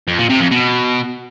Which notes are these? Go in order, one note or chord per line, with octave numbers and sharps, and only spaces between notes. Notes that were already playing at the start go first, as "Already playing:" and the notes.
F2
A#2
C3
F2
B2